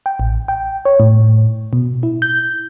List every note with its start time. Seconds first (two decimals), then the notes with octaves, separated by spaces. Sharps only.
0.06 G5
0.20 A1
0.48 G5
0.85 C#5
1.00 A2
1.73 B2
2.03 E4
2.22 G6